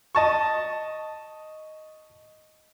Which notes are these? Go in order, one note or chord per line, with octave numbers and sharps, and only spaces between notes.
D#5 A5 C#6